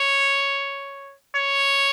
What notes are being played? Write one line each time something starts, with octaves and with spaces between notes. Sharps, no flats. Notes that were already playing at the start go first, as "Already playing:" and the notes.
Already playing: C#5
C#5